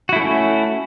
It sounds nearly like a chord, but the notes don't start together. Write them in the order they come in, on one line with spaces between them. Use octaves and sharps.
F#4 E4 A3 C#4